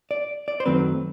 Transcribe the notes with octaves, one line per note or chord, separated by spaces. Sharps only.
D5
D5
C5
F#2 D#3 F#3 A3 C4 B4